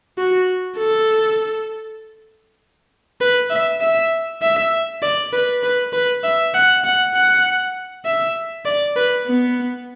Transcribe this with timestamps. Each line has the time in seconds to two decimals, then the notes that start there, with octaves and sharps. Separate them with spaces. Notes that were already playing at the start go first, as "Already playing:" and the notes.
0.18 F#4
0.78 A4
3.21 B4
3.51 E5
3.81 E5
4.42 E5
5.03 D5
5.33 B4
5.63 B4
5.93 B4
6.24 E5
6.54 F#5
6.84 F#5
7.15 F#5
8.05 E5
8.66 D5
8.96 B4
9.27 B3